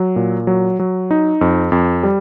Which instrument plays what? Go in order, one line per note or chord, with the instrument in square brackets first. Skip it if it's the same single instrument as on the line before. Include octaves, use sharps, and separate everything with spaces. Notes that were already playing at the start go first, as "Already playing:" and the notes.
Already playing: [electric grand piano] F#3
A#2
F#3
F#3
D#4
F2
F2
G3